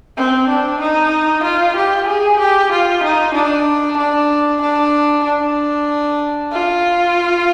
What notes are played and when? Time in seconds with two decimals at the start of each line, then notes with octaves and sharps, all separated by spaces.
0.17 C4
0.49 D4
0.80 D#4
1.43 F4
1.76 G4
2.07 G#4
2.39 G4
2.71 F4
3.03 D#4
3.34 D4
3.97 D4
4.61 D4
5.24 D4
6.52 F4